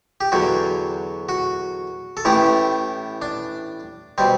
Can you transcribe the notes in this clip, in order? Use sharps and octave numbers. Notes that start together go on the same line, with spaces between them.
G4
E2 D3 F#3 F#4
F#4
A4
A1 A2 E3 A3 G4
D4
B2 G3 C4